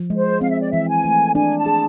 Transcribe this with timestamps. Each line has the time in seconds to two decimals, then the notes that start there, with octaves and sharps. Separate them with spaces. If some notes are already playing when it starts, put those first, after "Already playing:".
Already playing: F3
0.10 G#3
0.17 C5
0.41 C4 F5
0.51 E5
0.61 D5
0.71 E3 E5
0.88 G#5
1.05 A3
1.35 D4 G#5
1.59 A5
1.66 G#4